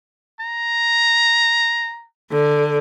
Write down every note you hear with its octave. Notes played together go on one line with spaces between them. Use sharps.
A#5
D3